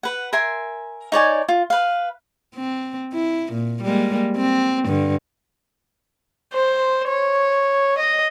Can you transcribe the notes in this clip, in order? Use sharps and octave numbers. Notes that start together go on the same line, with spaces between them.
B4 F#5
A#4 E5 G#5 C6
D#4 C#5 D5 G#5
F4
B4 F5
C4
E4
A#2
G3 G#3 A#3
C4
G2 D3
C5
C#5
D#5